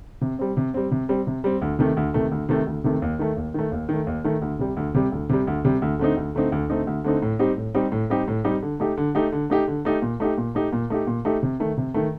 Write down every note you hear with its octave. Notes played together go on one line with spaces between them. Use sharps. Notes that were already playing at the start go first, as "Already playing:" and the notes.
C3
G3 C4
C3
G3 C4
C3
G3 C4
C3
G3 C4
D2
C3 D#3 A3
D2
C3 D#3 A3
D2
C3 D#3 A3
D2
C3 D#3 A3
D#2
D#3 A3
D#2
D#3 A3
D#2
D#3 A3
D#2
D#3 A3
D2
C3 G3
D2
C3 G3
D2
C3 G3
D2
C3 G3
D2
D3 A3 C4 D#4
D2
D3 A3 C4 D#4
D2
D3 A3 C4 D#4
D2
D3 A3 C4 D#4
A2
G3 C4 D#4 G4
A2
G3 C4 D#4 G4
A2
G3 C4 D#4 G4
A2
G3 C4 D#4 G4
D3
A3 D#4 G4
D3
A3 D#4 G4
D3
A3 D#4 G4
D3
A3 D#4 G4
A#2
A3 D#4 G4
A#2
A3 D#4 G4
A#2
A3 D#4 G4
A#2
A3 D#4 G4
C3
D#3 A3
C3
D#3 A3